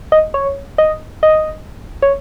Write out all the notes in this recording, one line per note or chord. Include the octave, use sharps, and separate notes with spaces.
D#5
C#5
D#5
D#5
C#5